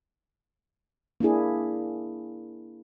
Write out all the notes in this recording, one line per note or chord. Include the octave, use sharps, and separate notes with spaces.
A#3 D4 E4 G#4